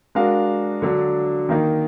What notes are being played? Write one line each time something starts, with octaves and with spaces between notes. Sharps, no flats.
G#3 D4 F#4 A#4 F5
D3 F#3 D4
D#3 A#3 D#4